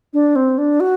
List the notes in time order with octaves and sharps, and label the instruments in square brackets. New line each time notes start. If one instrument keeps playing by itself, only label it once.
[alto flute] D4
C4
D4
F#4